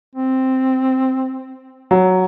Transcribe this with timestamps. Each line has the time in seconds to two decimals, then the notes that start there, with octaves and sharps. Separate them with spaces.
0.15 C4
1.91 F#3